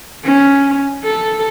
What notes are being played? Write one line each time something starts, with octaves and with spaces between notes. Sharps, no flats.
C#4
A4